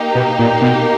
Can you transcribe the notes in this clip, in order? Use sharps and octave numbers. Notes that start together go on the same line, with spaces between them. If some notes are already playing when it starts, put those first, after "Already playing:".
Already playing: A#3 D#4 G4
B2
A#2
B2